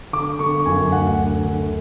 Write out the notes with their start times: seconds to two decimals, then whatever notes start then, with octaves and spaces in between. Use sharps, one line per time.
0.13 D3 D6
0.39 D3 C#6
0.66 F#2 G#5
0.92 D2 F#5
1.19 D3
1.45 D3